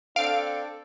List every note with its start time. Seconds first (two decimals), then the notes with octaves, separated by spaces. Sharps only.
0.16 C4 D4 A4 F5 D7